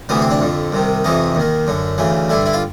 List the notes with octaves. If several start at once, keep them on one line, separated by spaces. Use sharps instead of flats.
D2 C3 E3 B3
C4
D4
F2 D3
C2 C3 D#3
F2 C3 E3 D#4
D#2 D#3
F#2 D3
D2 C#3 E3
G2 D3 E4
E4
F4